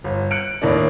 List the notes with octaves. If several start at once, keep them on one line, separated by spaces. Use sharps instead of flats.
G1
F#6 C#7 D7
D#2 A2 A#3 D4